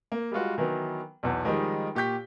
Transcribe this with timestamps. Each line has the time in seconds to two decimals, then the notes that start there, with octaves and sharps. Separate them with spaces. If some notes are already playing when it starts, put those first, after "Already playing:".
0.12 A#3
0.32 G3 G#3 F4 F#4
0.58 D#3 E3 F#3 B3
1.23 B1 E2
1.45 D#3 F3 G3 G#3 D#4
1.95 A#2 G4 C#6 G6 B6